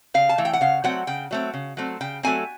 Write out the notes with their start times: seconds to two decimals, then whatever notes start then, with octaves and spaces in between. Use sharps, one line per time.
0.14 C#3 F5
0.29 A5
0.38 E3 A3
0.45 G5
0.53 F#5
0.61 C#3 F5
0.84 F#3 A3 C4 F#5
1.07 C#3 G5
1.31 F#3 A3 C4
1.54 C#3
1.77 F#3 A3 C4
2.01 C#3 G5
2.23 F#3 A3 C4 G#5